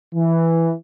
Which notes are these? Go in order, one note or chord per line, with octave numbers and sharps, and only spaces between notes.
E3